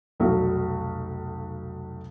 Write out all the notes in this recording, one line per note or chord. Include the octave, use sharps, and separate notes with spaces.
F1 B1 F#4